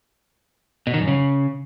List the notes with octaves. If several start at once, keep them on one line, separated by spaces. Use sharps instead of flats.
B2
D#3
F#2
C#3